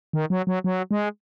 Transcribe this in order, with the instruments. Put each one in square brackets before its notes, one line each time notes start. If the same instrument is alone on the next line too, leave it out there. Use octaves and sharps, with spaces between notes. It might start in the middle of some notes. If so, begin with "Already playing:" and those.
[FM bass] D#3
F#3
F#3
F#3
G#3